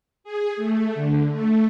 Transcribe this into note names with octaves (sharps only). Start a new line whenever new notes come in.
G#4
A3
D3
A3